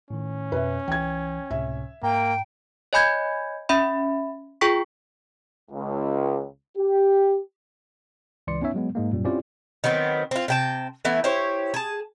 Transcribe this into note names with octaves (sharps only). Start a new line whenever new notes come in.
A2 D#3 C#4
F2 B2 B4 E5
C2 E3 G5 G#6
C#2 A2 C3 E5
G#2 A#3 G5 A#5
C#5 D#5 G#5 B5 G6 G#6
C#4 E5 B5
F4 G#4 G5 C#6 B6
C#2
G4
C#2 E3 D5 C6 C#7
B3 C#4 D#4 C#5 E5
F#3 G#3 B3
G#2 G#3 A#3
F#2 A#2 G3
C4 C#4 E4 F4 G4 D5
D#3 F#3 B3 C4
C4 F4
C3 G5 A5
E3 A3 B3 E4
E4 G4 C5 C#5
G#4 A5